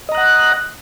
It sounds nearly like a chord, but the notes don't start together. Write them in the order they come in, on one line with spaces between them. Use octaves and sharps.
D#5 A#5 F#6 F#5